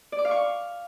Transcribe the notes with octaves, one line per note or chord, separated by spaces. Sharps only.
D5
D6
F5
C#6